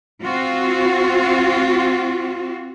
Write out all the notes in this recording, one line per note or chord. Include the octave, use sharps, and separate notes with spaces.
C4 F4 F#4